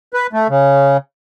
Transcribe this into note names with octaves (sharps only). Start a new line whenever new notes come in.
B4
A3
C#3